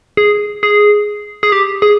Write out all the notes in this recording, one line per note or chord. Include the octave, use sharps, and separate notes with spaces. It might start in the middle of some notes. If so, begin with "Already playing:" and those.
G#4
G#4
G#4
G4
G#4